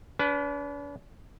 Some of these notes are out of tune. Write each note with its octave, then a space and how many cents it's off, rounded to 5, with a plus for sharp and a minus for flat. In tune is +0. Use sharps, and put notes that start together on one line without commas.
D4 -45 B4 +0